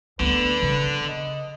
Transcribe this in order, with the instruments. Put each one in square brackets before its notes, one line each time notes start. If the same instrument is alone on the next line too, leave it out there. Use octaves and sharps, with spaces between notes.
[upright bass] D2 B3 [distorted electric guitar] D3 [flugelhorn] B4
[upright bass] C#3
[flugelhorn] D#5